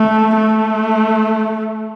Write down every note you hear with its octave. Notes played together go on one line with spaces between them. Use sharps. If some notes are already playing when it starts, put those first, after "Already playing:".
Already playing: A3
A3